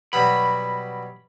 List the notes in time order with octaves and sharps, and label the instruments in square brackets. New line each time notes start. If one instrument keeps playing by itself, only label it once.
[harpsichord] B2 F#3 G3 [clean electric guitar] B5